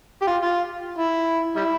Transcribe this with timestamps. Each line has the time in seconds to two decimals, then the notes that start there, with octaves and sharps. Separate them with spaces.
0.22 G4
0.27 F4
0.42 F4
0.98 E4
1.56 G3 E4